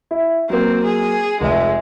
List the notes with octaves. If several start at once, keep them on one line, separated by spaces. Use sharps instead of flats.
E4
F#3 A#3 C4
G#4
F1 G#3 E5